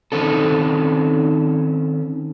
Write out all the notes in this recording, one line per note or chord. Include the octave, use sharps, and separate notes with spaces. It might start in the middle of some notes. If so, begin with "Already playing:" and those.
D#3 C4 C#4 A4